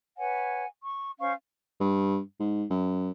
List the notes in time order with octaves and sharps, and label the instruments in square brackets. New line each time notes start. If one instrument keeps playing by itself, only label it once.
[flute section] B4 C#5 F#5 G#5
C#6
C#4 C5 F5 C#6
[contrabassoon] G2
G#2
F#2